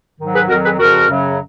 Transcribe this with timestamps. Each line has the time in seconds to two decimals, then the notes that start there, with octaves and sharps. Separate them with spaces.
0.20 G#2 D#3 F#3
0.34 G#4 B4
0.49 F2 D#3 F#3 F#4 A#4
0.64 G#4 B4
0.78 F2 C#3 F3 F#4 A#4
1.08 F#2 C#3 F#3